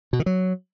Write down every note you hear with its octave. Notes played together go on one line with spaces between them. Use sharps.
B2
D#3
F#3